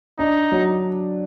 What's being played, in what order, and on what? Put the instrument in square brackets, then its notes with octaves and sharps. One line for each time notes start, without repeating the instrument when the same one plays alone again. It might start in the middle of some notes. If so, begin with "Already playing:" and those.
[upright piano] D4 [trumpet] D#4
[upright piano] F#3